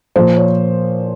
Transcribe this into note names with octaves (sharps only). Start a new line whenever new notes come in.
A#2 F3 C5
C#5